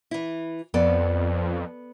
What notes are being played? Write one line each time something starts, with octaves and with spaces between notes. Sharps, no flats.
E3 E4
F2 B3 A4 D5